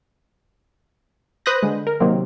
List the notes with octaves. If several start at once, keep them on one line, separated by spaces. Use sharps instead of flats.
B4 C5 D#6 F#6 G6 A#6
D3 G#3
A#4
C3 D#3 F#3 A#3 C4